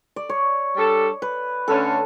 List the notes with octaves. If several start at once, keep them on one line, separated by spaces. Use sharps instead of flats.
D5
C#5
G3 D4 A4
B4
D3 A3 C#4 A4